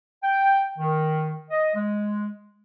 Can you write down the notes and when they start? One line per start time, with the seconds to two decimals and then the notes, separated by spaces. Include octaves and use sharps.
0.23 G5
0.79 D#3
1.50 D#5
1.75 G#3